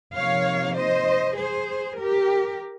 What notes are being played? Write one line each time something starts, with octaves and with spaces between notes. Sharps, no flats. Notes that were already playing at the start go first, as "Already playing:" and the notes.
C3 F3 A#3 D#4 C#5 F5
C5 D#5
G#4 C5
G4 A#4